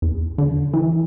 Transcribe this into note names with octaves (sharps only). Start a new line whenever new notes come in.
E2
D3
E3